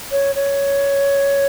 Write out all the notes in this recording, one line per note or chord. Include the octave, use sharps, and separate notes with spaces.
C#5
C#5